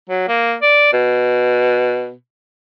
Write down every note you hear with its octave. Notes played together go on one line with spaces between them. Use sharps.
F#3
A#3
D5
B2